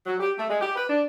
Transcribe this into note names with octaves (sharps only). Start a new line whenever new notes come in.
F#3
G4
A3
G#3
G4
B4
D4